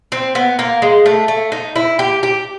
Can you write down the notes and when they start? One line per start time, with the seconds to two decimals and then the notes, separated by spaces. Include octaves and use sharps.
0.12 C4
0.35 B3
0.59 A#3
0.82 G#3
1.06 A3
1.28 A3
1.52 D#4
1.76 E4
1.99 G4
2.23 G4